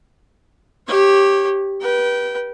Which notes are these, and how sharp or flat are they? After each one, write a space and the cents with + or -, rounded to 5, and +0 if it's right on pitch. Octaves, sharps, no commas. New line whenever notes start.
G4 +0 C#5 -25
B4 -30 G5 -20